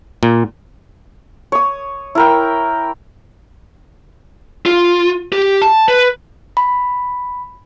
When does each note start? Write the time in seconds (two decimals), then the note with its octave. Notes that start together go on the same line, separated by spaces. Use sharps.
0.23 A#2
1.52 C#5 D#6
2.15 E4 A#4 G5
4.66 F4
5.32 G4
5.62 A5
5.88 B4
6.57 B5